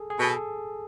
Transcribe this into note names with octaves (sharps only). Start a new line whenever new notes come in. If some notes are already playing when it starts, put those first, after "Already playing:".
Already playing: G#4 A4
G#4
B2 A4